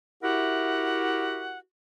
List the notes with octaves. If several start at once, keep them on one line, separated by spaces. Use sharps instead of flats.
E4 F#4 G4 A#4 E5 F#5